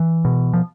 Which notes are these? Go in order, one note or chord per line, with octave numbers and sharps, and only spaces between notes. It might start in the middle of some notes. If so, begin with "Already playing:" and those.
Already playing: E3
B2
F3